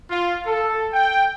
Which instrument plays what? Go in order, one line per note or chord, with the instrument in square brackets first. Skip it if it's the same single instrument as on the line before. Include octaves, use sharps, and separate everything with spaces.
[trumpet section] F4
A4
G5